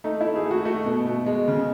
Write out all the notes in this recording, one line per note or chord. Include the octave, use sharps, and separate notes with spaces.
A3 D#4
A3 E4
G#4
A3
F#4
A3 F#4
B2
B2
G#3
C#3